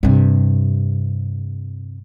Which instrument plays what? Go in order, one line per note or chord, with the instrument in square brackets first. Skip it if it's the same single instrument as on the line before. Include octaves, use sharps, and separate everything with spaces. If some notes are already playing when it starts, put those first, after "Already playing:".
[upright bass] G2 C3